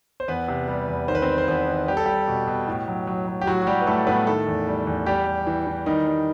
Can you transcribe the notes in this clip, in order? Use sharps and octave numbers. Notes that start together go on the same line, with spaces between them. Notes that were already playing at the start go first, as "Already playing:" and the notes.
C5
E2 B3 B4
C3
G3
E2
D#3 C5
B4
C4 C5
G3
C5
E2 B3 B4
D#3
G3 G4
A4
G3 G4
B2
B2
A2
F#3
F#3
F#3
G4
A2 F#3 F#4
F#4
F#3 G3 G4
B4
A2 A3 A4
A2 B3 B4
D#3 A3 A4
E2
G3
E2
G3 G4
G3
E3
E3
D#3 G3 D#4
G3